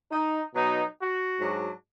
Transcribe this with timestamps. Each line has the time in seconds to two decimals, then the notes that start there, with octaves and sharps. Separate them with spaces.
0.11 D#4
0.53 B2 F#3 B3 D#4
0.97 F#4
1.39 G#2 F#3 D4